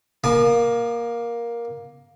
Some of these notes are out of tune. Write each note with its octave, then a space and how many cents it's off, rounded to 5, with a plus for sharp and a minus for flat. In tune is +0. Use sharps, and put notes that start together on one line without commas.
A#3 +10 G#5 +40 D#6 -45